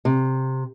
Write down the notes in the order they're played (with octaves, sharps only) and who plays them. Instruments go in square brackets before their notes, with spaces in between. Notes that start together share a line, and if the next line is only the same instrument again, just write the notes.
[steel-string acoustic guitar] C3